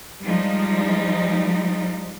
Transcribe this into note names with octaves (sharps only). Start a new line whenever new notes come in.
F3 G3 G#3 D#4